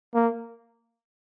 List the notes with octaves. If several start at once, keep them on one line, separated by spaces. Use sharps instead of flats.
A#3